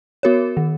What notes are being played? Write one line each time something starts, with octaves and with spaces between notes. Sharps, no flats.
B3 F#4 A#4 C#5
D#3